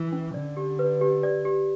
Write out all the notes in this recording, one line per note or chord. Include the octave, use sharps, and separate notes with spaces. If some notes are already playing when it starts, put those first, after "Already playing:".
Already playing: E3
C#4
D3 D5
G4
B4
G4
D5
G4